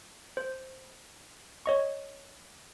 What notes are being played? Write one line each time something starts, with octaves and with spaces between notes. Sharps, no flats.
C5
C#5 D#5 C#6